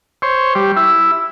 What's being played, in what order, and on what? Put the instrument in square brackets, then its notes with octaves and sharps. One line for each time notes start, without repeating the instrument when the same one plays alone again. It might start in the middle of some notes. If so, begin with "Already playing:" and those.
[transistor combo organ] C5 C#5
G3
E4